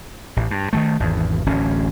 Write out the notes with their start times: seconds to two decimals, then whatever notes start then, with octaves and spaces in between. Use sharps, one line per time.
0.36 A1
0.51 G2
0.73 D#3 E3 A3
1.00 G#1 E2
1.46 D1 A1 C#4